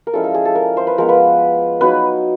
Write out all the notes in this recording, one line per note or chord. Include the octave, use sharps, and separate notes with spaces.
A#4
F3 G#3 C#4 E4 A4
A4
G#4
A4
A#4
C5
B4
F3 G#3 B3 A#4
B4
F#3 B3 D#4 B4